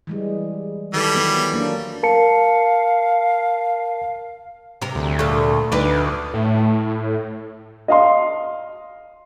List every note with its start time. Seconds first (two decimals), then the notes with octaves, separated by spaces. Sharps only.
0.07 E3 G3 G#3
0.93 D#3 E3 G3 A4
1.15 F#3 B3
1.52 F#3 A#3 D4
2.03 A#4 F5 A5 C#7
4.82 C3 A#4
4.95 D2
5.19 A#2 A3
5.72 D2 D4 D#4 B4
6.33 A2
7.88 D#5 F5 C6